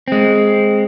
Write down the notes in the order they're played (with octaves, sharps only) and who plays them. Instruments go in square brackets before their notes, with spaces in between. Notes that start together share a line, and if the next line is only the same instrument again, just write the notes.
[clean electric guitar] G#3 C4